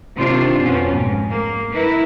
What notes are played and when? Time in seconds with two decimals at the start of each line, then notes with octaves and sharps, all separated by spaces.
0.17 C3 D#3 D4 F4 C5
0.59 F2 B2 C#4
0.96 G#2
1.30 A#3
1.73 E4 A#4 B4